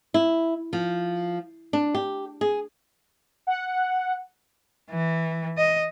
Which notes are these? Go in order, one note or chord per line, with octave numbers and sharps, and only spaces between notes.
E4
F3
D4
G4
G#4
F#5
E3
D#5